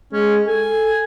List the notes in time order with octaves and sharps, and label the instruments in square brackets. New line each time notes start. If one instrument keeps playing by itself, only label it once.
[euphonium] G#3 [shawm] C#4
[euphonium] A4 [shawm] G#5